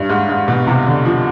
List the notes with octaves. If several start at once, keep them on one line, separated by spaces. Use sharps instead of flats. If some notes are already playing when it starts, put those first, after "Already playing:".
Already playing: G2
G#2
G#2
B2
C3
D3
F3